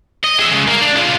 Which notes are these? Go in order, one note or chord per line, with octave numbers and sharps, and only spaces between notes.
D#5
G#4 E5
C#3 G#3
A#3
D4
G#3 F4